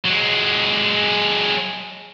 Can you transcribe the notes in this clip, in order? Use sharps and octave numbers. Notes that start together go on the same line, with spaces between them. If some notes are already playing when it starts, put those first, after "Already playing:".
F#3 G#3